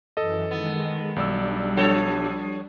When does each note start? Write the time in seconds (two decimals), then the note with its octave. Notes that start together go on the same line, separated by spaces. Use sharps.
0.17 F#2 E3 A4 D#5
0.51 D#3 G#3 B3
1.16 B1 G3 D4 D5 E6
1.77 F3 A4 C#5